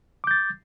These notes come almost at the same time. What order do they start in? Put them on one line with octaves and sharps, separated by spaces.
D6 G6 A6